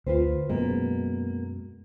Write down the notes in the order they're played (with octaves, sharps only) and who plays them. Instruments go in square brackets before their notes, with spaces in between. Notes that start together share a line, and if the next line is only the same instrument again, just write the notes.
[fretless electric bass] D2 [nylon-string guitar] F4 B4 C5
[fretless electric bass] F#2 B2 G#3 [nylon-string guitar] A#3 B3